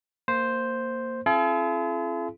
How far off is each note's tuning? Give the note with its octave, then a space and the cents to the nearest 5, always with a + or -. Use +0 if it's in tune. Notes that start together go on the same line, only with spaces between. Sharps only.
A#3 -15 C5 +0
C4 +35 F4 -45 G#4 +45